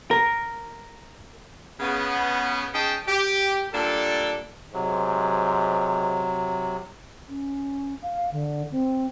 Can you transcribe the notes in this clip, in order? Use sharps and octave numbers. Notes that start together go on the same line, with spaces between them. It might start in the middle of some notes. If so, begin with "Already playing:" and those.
A#4
C#3 B3
C#4 D#4 G#4 G5 A5
G4
A#2 G3 D4 A4
G#2 C3 F#3
C#4
F5
D3
C4